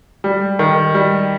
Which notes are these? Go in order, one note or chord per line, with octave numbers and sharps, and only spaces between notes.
G3
D#3
G3